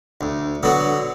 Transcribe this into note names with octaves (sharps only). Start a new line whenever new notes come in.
D2
D3 F#3 B3